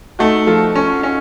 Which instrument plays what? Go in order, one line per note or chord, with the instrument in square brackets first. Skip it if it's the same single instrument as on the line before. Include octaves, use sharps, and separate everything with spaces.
[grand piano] A3 [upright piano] D#4 F#4
[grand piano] F3 [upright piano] F4 A4
[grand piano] C#4
C#4